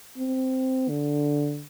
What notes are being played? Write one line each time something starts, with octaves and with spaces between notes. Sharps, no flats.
C4
D3